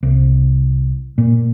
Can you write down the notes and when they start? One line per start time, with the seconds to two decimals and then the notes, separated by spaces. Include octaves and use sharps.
0.03 C2
1.18 A#2